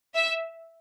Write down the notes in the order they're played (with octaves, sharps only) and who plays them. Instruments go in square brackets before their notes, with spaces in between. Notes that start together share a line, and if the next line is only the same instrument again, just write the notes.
[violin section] E5